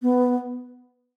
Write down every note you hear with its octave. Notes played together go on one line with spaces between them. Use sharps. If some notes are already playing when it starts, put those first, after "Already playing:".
B3